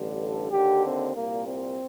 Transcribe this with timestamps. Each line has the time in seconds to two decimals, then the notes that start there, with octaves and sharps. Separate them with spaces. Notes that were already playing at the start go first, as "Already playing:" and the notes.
Already playing: A1 G2 D3
0.21 A4
0.51 D#2 D3 G4
0.84 C4
1.15 C2 A#2 A#3
1.46 C4